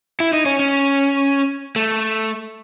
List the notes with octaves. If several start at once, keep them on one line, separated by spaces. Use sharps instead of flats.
E4
D#4
C#4
C#4
A3